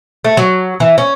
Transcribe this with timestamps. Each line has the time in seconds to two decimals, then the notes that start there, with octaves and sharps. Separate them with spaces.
0.24 A3
0.37 F#3
0.80 E3
0.98 C#4